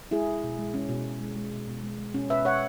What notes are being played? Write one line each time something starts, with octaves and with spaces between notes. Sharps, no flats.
G#3 E4 G#4
B2
B2
G#3
G#3 C#4
B2
B2
G#3
G#3
B2
B2
G#3
G#3
B2 C#4
B2 B4 E5
G#3 C#5 F#5